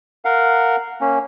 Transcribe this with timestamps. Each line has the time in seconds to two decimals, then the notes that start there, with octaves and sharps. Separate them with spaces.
0.25 A#4 F5 F#5
1.01 A#3 C#4